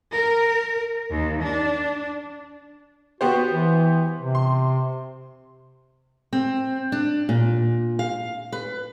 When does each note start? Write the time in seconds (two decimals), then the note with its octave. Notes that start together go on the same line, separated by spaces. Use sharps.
0.13 A#4
1.11 D#2
1.42 D4
3.21 B3 F#4 G4 C5
3.51 E3
4.20 C3
4.35 C6
6.33 C4
6.92 D4
7.29 A#2
7.99 F5
8.52 B4